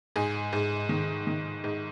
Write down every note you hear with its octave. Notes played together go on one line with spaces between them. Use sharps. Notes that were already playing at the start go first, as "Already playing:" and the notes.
G#2 G#4
G#2
D#3
D#3
G#2